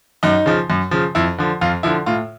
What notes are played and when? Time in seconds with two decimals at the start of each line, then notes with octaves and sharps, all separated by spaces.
0.23 F#2 D#4
0.46 C#3 F3
0.70 F#2
0.91 C#3 F3
1.15 F2 E4
1.38 D3 F3
1.61 F2 F4
1.83 D3 F3 E4
2.06 A2 F4